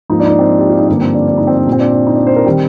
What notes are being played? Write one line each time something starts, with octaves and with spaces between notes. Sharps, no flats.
G#2 F3 A#3 D#4
D4
D#4
D4
C4
G4
F4
D#4
G2 D3 F3 A#3 D4
C4
D4
D4
D#4
C4
D4
A#2 G3 A#3
C4
D4
D4
D#4
D4
C5
A#4
D#3 G3 C4